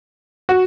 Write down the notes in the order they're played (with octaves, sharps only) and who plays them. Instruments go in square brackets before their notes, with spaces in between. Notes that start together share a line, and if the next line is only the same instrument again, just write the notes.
[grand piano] F#4